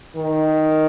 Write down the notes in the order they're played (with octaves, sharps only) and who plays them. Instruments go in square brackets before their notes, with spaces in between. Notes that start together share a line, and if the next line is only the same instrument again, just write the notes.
[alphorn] D#3